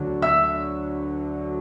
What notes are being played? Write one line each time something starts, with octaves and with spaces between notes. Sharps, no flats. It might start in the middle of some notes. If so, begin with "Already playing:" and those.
Already playing: D2 D3 F#3
E5 E6